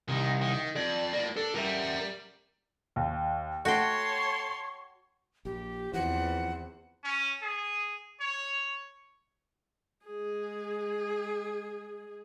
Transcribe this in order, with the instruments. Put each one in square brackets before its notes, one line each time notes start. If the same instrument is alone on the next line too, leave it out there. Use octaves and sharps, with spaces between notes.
[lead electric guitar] C2 [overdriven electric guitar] D#3
[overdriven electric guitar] D#3
[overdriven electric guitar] F2 [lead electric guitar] D5
[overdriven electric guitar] A2 A#3
[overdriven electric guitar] D4 [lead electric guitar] A4
[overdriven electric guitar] G3 [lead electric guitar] A#4 E5
[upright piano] D#2
[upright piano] A3 [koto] F#4 G5 [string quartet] C#5 A5 C6 [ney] C#6
[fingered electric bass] A#1 [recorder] G4
[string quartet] E2 C4 [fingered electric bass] E3 F3 [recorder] F#5
[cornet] C#4
G#4
C#5
[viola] G#3 G#4